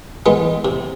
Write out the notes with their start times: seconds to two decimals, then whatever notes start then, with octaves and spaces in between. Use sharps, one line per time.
0.26 E3 G#3 B3
0.65 C3